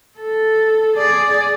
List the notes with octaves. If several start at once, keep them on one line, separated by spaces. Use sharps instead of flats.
A4
G#4 D5